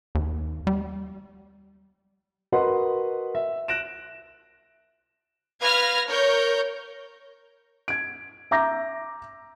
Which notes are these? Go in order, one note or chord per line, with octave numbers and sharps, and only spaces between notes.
D#2
G3
F#4 A#4 B4 D#5 F#5 C6
E5
F#6 A#6 D7 E7
B4 F5 F6 G#6 A#6
A#4 C#5 G6
G#6 D7
E5 A#5 D6 G6 A#6